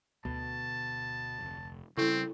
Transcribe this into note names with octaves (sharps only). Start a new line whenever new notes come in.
D2 B2 A5
F1
C#3 G3 C4 E4 A4